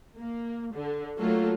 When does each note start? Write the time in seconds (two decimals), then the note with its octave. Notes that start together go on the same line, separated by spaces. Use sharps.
0.18 A#3
0.74 D3
1.18 F#3 A3 A#3 F4 A4